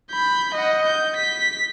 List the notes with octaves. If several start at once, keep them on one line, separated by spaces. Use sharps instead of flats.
B5 G6
D#5 F#5
G6
B6